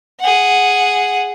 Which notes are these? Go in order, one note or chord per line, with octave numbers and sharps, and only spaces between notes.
G#4 F#5